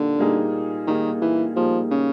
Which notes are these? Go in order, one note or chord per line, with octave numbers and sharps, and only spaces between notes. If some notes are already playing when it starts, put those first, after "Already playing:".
Already playing: A#2 D3 G3 A#3 D#4
A#2 G3 A#3 D#4 G#4
A#2 D#3 G3 A#3 D#4 G#4
E3
A#2 F3 G3 A#3 D#4 G#4
C#3